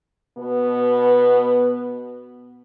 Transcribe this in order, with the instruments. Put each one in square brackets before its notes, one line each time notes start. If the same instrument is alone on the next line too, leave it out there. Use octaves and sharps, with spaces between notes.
[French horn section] B2 B3